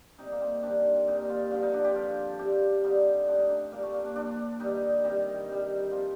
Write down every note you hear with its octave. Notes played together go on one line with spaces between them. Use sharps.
C3 G3 D#4
A#3
C4
C3 D#3 G3 D4
A#2 G3 D#4
F4
G2 D3 F3 F4
D#4
D4
G4
G2 F3 F4
C3 G3 G4
G2 D3 G3 D#4
A2 F3 D4
D#4
D4
A#2 G3 A#3
A3
A#3
D4
A#2 F3 D4
G2 D#3 G3 D#4
C3 D#3 G3
C3 G3
C3 F3 F4